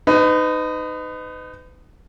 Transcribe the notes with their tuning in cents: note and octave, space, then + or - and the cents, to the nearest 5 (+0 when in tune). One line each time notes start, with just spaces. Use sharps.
D#4 -10 B4 +35